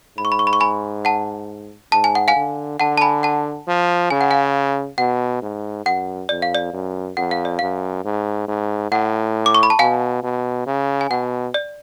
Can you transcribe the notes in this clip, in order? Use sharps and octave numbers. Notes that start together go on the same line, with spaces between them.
G#2 B5
C#6
B5
C#6
B5
C#6
G#5 B5
F#5 A5
G#2 A5
G#5
F#5
F5 G#5
D3
D3 F#5 A5
A5
G#5 B5
F#5 A5
F3
C#3 G#5
F#5
F5 G#5
B2 F#5
G#2
F#2 F#5
F2 D5
F5
D5
F#2
F2 F#5
F5
D5
F#2 F5
G#2
G#2
A2 F#5
D6
C#6
B5
A5
B2 F5 G#5
B2
C#3
G#5
B2 F#5
D5